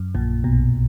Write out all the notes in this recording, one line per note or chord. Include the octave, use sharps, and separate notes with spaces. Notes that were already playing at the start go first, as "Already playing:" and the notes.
Already playing: F#2
A#1 A#2
B1 B2